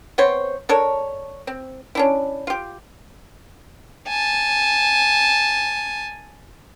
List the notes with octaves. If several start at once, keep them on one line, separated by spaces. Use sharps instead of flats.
B3 C4 C5 C#5
D4 A4 A#4 C#5
C4
C#4 D4 E4
F4 G4
G#5 A5